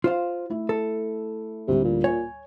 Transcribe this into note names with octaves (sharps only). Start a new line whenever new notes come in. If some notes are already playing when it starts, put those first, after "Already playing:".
F4 C5 F5
A3 E4
A4
D2 A2 C3 G3
A#2
C#5 G#5